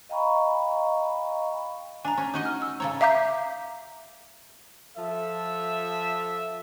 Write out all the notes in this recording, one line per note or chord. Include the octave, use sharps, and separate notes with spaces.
D#5 F5 G5 A#5 B5 C#6
D4 G#5 A#5
C#4
D#4 F#4 D#5
F6
E6
C#3 A4 C#5 A#5
E5 F5 A#5 D6 G6 B6
F3 A4 E5